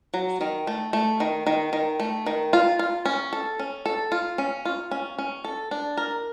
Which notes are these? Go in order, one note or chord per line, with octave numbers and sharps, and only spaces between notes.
F#3
D#3
A3
A3
D#3
D#3
D#3
A3
D#3
F4
F4
C#4
A4
C#4
A4
F4
C#4
F4
C#4
C#4
A4
D4
A#4